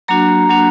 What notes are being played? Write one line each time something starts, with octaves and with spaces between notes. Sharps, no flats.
F#3 A#3 D4 F#4 A#5
F#3 A#3 D4 F#4